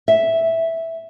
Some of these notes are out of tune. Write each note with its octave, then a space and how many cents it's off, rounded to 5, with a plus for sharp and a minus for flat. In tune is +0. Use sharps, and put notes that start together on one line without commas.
E5 -5